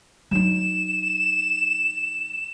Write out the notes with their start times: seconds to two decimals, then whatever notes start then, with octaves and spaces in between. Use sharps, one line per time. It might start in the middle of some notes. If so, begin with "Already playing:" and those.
0.31 F#3 D#4 E7